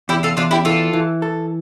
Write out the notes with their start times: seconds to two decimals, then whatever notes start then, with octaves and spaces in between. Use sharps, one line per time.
0.09 E2 E4 G4
0.23 F4 A4
0.37 E2 D4 F4
0.51 E4 G4
0.65 E3 F4 A4
0.93 E3
1.22 A4